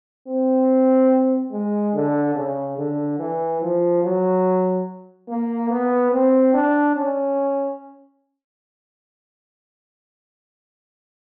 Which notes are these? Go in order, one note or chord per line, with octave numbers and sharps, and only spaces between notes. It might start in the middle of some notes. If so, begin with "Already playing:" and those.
C4
G#3
D3
C#3
D3
E3
F3
F#3
A#3
B3
C4
D4
C#4